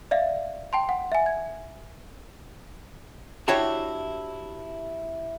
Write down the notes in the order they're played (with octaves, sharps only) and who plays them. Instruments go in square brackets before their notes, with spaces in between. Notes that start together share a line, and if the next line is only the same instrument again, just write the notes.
[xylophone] D5 E5 F5
G5 A5 C6
F#5
E5 G#5
G#6
[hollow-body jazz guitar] D4 E4 F#4 G4 C#5 E5